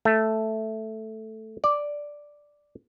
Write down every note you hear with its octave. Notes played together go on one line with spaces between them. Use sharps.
A3
D5